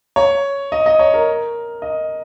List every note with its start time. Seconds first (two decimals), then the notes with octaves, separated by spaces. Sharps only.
0.16 C#5
0.72 D#5
0.86 D#5
0.99 C#5
1.14 A#4
1.82 D#5